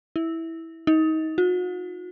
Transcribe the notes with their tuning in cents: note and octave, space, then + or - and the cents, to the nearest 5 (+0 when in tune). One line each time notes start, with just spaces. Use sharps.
E4 -10
D#4 +25
F#4 -40